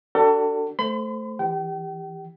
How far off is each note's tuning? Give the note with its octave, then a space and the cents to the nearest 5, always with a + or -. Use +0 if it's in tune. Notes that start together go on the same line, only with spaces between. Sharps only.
D4 +0 F#4 +45 A4 +30
A3 +0 C5 +0 B5 +45
E3 +0 G4 +20 G5 -40